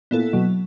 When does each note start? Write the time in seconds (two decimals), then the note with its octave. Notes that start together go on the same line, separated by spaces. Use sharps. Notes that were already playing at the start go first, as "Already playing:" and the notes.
0.11 A#2 B3 E4 A4
0.33 B2 F#3